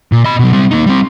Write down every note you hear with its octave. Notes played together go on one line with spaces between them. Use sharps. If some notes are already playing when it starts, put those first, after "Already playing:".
A#2
D#5 B5
B2 F#3
G3 C4
A#3 D#4
G3 C4